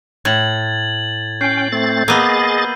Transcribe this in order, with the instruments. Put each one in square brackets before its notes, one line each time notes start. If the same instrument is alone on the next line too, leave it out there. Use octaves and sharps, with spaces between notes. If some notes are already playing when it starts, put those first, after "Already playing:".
[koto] A2 [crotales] G#6 A6 F#7
[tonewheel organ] C#4 G5 [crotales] G6 C7
[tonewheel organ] A3 C4 A6
[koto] A#3 B3 [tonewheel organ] G#4 D#5 A6 [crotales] E6 D#7 G7